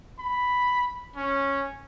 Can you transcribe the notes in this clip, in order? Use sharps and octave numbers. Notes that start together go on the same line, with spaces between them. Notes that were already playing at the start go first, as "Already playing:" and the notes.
B5
C#4